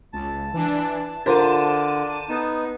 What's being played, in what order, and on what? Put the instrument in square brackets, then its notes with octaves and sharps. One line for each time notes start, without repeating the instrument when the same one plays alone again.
[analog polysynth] C#2 [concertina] A5
[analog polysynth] E3 D4
[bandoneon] D3 [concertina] D4 [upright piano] F4 A#4 C5 [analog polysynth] A5 D#7
[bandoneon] B3 D#4